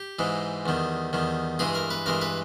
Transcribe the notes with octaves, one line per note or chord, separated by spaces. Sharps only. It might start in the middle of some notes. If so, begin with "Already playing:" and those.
Already playing: G4
G#2 E3 G#3
E2 D#3 G3
E2 D#3 G3
G2 E3 G#3 G#4
A#4
B4
G2 E3 G#3 A#4
B4